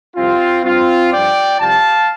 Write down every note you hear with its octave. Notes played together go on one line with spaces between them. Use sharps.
C2 C3 F3 C4 F4
G2 G3 C4 F4
G2 F3 D5 G5
C2 C3 F3 F5 A5